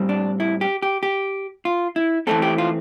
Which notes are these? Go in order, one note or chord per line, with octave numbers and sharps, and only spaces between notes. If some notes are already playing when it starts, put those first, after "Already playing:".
Already playing: A2 G3 C4
D4
E4
G4
G4
G4
F4
E4
E3 A3 C4 A4
G4
F4